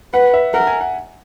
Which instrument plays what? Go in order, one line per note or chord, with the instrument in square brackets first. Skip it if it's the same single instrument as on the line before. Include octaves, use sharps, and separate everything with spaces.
[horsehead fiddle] B4 [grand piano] F#5
[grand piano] E5
[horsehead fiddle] A#4 [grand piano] F#5
[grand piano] G#5
F#5